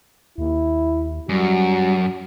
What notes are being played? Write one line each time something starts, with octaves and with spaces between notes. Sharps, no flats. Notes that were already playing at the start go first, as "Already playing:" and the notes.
D#2 E4
F#2 G3 F#4